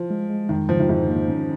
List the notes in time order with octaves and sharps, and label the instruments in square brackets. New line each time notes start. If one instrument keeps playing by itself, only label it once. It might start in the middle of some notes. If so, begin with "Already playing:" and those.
Already playing: [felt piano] F3
[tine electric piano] G#3
G#3
[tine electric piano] F2 [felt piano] D#3
[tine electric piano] C#3 [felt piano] F3
[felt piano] D#3
[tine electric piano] F2 [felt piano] G#2
[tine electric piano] A#3
C#4